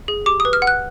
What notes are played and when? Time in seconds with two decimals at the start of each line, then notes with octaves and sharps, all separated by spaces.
0.08 G#4
0.26 G4 D6
0.40 D#6
0.45 B4
0.53 F6
0.62 F#5
0.67 F#6